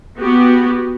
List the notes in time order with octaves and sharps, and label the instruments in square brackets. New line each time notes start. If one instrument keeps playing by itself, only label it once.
[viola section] B3 F#4 G4